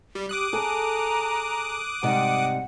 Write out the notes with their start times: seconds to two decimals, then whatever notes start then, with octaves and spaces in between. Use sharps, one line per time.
0.15 G3
0.29 G4 D6 D#6 F#6
0.53 G#4 A4 A#5
2.03 G#2 C3 G3 F#5